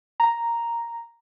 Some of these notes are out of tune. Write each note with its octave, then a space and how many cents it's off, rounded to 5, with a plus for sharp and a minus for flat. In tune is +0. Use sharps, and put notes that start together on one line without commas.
A#5 +0